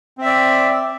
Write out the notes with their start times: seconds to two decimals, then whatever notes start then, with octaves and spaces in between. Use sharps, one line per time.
0.18 C4
0.22 E5
0.26 D5